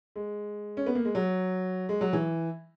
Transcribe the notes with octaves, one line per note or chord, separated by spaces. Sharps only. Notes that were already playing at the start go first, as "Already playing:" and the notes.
G#3
C#4
B3
A#3
G#3
F#3
G#3
F#3
E3